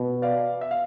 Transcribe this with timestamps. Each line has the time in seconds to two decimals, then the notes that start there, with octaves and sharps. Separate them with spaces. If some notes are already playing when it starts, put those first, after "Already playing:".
Already playing: B2
0.22 D5 F5
0.61 E5
0.71 F5